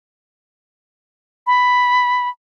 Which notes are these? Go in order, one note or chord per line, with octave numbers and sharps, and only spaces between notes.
B5